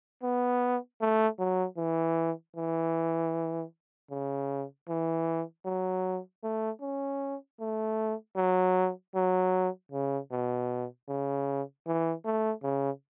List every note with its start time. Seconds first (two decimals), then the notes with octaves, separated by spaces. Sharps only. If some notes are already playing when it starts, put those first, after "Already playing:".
0.23 B3
1.01 A3
1.39 F#3
1.77 E3
2.56 E3
4.11 C#3
4.89 E3
5.66 F#3
6.43 A3
6.81 C#4
7.60 A3
8.36 F#3
9.15 F#3
9.91 C#3
10.31 B2
11.08 C#3
11.87 E3
12.25 A3
12.63 C#3